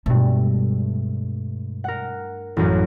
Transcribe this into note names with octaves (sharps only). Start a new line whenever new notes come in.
G2 B2 G#3 A3
A#4 F#5
A1 F#2